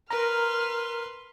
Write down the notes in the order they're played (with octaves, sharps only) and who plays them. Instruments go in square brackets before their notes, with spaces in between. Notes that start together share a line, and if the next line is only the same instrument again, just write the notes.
[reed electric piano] A#4 A#5 [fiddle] B4 C6 [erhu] F6